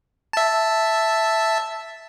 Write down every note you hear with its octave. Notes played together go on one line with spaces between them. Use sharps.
E5 A5